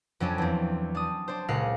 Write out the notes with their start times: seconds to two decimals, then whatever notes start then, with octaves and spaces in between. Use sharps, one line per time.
0.20 F2 F#3 C#4 D4
0.38 E2 C4
0.95 D4 D#6
1.28 D4 C5
1.49 C#2 A#2 G#3 F#5 F6 C7